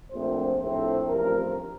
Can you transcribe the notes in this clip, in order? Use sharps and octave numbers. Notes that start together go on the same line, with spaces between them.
A#1 A#2 A3 C4 C5
A#1 A2 A3 C4 C5
A1 G2 F3 C4 A#4